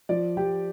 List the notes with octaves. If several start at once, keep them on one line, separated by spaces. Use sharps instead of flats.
F3 D5
F3 G4 G5